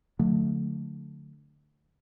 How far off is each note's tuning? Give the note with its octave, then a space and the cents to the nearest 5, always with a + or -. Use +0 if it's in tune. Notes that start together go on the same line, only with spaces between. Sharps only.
D3 +0 F#3 -40 A3 +0